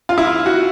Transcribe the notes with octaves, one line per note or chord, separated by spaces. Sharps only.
F4
E4
F4
F#4